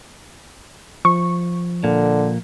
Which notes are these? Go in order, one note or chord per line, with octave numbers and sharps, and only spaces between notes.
F3 C#6
A#2 D3